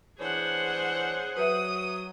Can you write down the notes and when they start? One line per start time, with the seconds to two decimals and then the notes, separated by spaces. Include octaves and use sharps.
0.20 E3 D4 G#4 C5 C#5 F#5
1.37 F#3 B4 E5 D#6